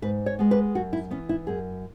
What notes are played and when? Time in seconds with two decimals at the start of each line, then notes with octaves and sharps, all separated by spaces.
0.02 G#2 B4
0.26 C#5
0.39 G#3 B3
0.51 B4
0.75 F#2 F#4
0.93 E4
1.11 E3 B3 C#4
1.29 E4
1.47 F#2 G#4